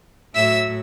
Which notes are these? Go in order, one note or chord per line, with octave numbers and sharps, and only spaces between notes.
A2 F#3 E5 E6